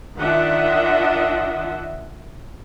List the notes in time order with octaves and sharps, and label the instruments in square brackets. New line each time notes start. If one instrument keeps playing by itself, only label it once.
[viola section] D#3 D4 F4 D#5 E5 F#5